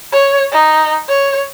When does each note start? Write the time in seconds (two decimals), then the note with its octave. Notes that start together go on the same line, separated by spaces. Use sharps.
0.12 C#5
0.52 D#4
1.08 C#5